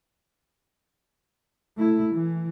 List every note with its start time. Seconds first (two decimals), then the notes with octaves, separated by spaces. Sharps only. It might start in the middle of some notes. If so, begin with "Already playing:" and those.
1.77 A3 E4
2.14 E3